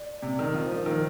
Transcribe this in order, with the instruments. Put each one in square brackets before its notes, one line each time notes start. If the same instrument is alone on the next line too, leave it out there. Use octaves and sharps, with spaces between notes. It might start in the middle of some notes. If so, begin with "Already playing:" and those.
Already playing: [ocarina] D5
[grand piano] C3
D#3
F3
[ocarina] C5
[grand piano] F3 [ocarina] A#4
[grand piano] D#3 [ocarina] C5